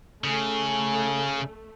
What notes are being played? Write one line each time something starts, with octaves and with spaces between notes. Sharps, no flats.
C#3 A3 G#5